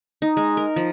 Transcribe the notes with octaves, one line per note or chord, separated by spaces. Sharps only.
D#4
G#3
A#4
F3